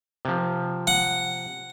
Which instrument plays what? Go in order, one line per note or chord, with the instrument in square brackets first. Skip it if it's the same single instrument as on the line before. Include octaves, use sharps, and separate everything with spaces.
[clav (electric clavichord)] C3 F3
[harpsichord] F#5